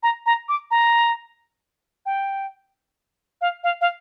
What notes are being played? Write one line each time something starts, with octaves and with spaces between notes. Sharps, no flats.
A#5
A#5
D6
A#5
G5
F5
F5
F5